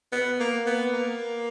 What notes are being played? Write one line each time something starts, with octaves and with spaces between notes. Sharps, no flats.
B3
A#3
B3
A#3